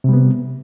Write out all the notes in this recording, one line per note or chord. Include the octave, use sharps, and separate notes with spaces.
C3 G3 B3